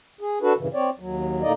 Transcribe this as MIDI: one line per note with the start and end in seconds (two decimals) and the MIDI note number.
0.21 0.39 68
0.42 0.53 62
0.42 0.53 66
0.42 0.53 69
0.42 0.53 71
0.58 0.68 43
0.58 0.68 46
0.58 0.68 49
0.58 0.68 52
0.74 0.90 60
0.74 0.90 73
0.74 0.90 74
0.99 1.42 39
0.99 1.42 54
1.42 1.53 45
1.42 1.53 50
1.42 1.53 58
1.42 1.53 63
1.42 1.53 74
1.42 1.53 75